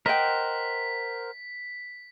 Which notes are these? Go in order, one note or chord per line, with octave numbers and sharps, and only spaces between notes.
A#4 C5 D#5 F#5 G5 B6